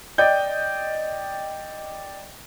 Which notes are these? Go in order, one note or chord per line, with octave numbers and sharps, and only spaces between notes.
D5 D#5 G5 G6